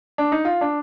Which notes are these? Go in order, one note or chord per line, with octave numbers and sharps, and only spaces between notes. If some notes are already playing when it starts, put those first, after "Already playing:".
D4
D#4
F4
D4